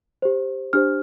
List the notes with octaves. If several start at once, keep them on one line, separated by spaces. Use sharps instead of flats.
G4 C5
D4 G4 C5 F6